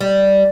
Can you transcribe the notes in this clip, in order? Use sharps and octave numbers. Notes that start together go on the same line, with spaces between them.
G3